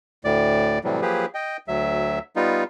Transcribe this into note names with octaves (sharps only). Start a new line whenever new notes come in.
D2 A2 D5
A2 C3 E3 F#3 G3
F3 F#3 A#3 G4 G#4 B4
D#5 G5
D2 F#3 E5
G3 B3 D#4 F4